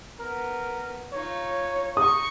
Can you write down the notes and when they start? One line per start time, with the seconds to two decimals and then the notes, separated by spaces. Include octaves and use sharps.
0.20 B3 A#4
1.13 D#4 F4 C#5
1.97 D#4 C#6 D#6